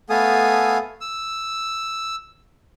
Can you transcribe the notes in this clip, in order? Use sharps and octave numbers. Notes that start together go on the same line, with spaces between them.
A3 B3 A4 F5 G#5 D#6
E6